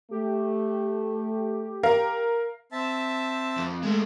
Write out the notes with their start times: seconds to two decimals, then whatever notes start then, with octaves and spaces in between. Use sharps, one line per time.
0.11 A3 G4
1.83 A#4 F5
2.72 C4 E5 A5
3.57 F2
3.83 G#3 A3